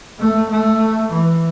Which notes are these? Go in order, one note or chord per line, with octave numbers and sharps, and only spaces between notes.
A3
A3
E3